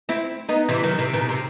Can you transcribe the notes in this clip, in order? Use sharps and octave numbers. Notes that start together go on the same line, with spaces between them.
C4 E4
B3 D#4
C3 E3
D#3 F#3
C3 E3
B2 D#3
C3